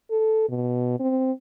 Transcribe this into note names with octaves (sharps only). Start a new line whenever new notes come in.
A4
B2
C4